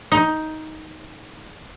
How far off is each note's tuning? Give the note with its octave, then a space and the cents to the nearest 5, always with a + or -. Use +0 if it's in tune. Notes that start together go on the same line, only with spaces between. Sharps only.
D#4 +10